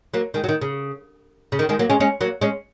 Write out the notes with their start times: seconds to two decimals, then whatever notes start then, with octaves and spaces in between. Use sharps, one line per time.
0.14 F#3 A#3
0.34 D#3 G#3
0.44 F#3
0.49 D#3
0.61 C#3
1.52 C#3
1.59 D#3
1.69 D#3 G#3
1.79 F#3 A#3
1.90 G#3 C#4
2.00 G#3 C#4
2.21 F#3 A#3
2.41 G#3 C#4